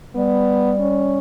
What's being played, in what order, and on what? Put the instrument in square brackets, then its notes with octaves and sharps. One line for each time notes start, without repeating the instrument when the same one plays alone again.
[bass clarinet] G3 [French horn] B3
[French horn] C#4